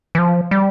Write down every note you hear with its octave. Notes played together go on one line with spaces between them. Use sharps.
E3
F3
G3